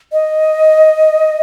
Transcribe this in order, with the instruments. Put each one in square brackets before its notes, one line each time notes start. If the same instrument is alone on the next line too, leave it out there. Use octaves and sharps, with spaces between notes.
[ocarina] D#5